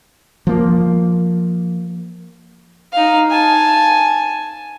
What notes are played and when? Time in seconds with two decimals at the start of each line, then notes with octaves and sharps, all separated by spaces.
0.47 F3 A#3
2.93 D#4 F5
3.31 G#5 A5